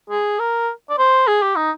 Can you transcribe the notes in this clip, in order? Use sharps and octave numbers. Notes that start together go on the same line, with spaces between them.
G#4
A#4
D5
C5
G#4
G4
D#4